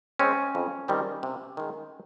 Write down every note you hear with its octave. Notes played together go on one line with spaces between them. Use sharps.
G#3 C4 C#4
F2
D#3 G3 C4
C3
D#3 G#3